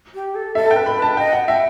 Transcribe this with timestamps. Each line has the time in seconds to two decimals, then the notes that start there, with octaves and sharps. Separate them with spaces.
0.14 G4
0.35 A4
0.55 A4 E5
0.66 A5
0.71 G5
0.76 B4
0.86 B5
0.96 B4
1.02 A5
1.17 D#5 G5
1.33 F#5
1.48 E5 G5